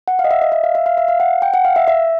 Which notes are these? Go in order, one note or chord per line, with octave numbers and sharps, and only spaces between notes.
F#5
F5
D#5
E5
D#5
E5
F5
E5
F5
E5
F5
F#5
G5
F#5
F5
E5
E5